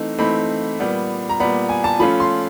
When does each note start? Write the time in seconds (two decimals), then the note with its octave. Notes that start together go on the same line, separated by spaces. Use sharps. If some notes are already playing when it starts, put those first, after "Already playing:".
Already playing: E3 A3 C4 D#4
0.19 E3 A3 C4 D#4 B5
0.80 A#2 G3 B3
1.29 A#5
1.40 A#2 G3 B3 B5
1.69 G#5
1.84 A5
1.99 F3 A3 C#4 F4 B5
2.20 C6